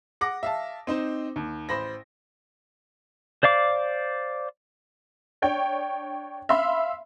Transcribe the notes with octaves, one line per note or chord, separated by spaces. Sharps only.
F#5 D6 A#6
E5 F5 A5
C4 D#4 C5
D#2
A1 C5 B5 A#6
C5 D5 F5 D6
D4 C#5 G5
E5 F5 B5 C6